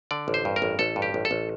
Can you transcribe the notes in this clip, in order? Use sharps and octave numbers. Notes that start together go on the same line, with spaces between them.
D3 D5
A1
C5
G2
A#4
A1
A1 A4
G2
G4
A1
A4
A1